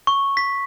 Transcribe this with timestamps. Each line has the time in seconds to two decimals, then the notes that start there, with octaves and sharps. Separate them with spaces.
0.07 C#6
0.37 B6